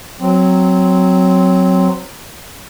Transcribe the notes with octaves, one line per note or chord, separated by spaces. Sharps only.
F#3 C4